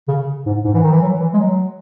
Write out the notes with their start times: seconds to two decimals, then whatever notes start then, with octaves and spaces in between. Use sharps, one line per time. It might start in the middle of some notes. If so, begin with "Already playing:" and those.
0.08 C#3
0.46 G#2
0.64 G#2
0.74 E3
0.83 D#3
0.92 E3
1.02 F#3
1.20 E3
1.34 G#3
1.38 F#3